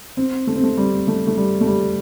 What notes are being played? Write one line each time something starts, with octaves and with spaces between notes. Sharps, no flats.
C4
A3
C4
A3
G3
A3
A3
G3
A3
G3